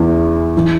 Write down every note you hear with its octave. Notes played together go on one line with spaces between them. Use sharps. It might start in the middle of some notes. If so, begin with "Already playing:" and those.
Already playing: E2 E3 B3 E4
E3